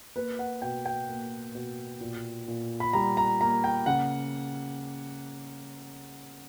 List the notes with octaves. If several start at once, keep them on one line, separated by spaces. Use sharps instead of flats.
A#3 B4
F#5
B2 G5
G5
A#3
B2
A#2
A#2
B5
G3 A#5
A#5
A#3 A#5
G5
C#3 F#5